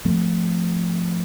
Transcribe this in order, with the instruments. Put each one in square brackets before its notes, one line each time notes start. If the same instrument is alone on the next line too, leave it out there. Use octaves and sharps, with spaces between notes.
[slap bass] G#2 F3 A3 C4